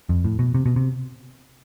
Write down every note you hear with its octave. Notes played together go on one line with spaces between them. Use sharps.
F2
A2
B2
C3
B2
C3